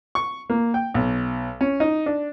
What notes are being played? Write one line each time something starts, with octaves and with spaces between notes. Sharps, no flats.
C#6
A#3
G5
B1
C#4
D#4
D4